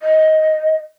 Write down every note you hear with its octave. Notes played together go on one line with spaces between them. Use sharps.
D#5